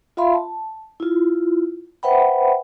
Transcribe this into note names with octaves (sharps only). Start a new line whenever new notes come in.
F4 E5 F5 B5 C6
A5
E4 F4
B4 C5 E5 F#5 G5 B5